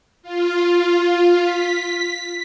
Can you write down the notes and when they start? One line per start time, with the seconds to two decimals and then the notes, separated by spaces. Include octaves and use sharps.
0.23 F4
1.40 B6